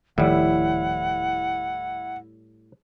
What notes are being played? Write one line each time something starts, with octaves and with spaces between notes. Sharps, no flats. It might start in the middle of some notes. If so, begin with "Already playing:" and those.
D#1 A2 D#3 F3 G3 E4 F#5